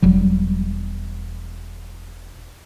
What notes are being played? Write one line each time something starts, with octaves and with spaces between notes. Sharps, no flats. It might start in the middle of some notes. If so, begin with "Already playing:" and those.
E1 F#3 G3